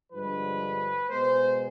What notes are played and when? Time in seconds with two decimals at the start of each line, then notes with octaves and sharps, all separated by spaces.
0.13 G2 D3 F3 G#3 B4
1.10 B2 G#3 B3 C5